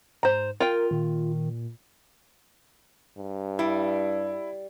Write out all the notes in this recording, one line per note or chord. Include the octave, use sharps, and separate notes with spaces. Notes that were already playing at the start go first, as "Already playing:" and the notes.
G#2 C5 A#5
F4 A#4 G5
A#2 D#3
G2
G3 E4